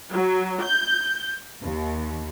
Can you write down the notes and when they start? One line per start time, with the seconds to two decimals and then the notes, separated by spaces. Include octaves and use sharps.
0.10 F#3
0.61 G6
1.62 D#2